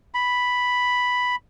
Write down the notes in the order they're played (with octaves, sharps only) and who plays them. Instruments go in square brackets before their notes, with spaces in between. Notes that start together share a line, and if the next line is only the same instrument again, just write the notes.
[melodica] B5